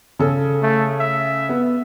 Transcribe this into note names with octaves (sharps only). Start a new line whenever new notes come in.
C#3 A4
A3
E5
B3